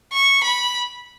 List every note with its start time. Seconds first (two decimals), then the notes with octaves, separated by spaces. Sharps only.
0.13 C#6
0.44 B5